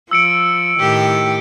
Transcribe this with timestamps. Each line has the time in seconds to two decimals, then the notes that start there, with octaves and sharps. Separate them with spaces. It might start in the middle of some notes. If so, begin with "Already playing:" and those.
0.11 F3 E6 C#7 D7
0.80 A2 D#3 G4